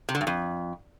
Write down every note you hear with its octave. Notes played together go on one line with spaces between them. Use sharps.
C3
D3
G2
F2